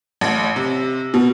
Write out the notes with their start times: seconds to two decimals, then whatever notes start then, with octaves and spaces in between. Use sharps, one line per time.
0.21 A1
0.56 C3
1.14 B2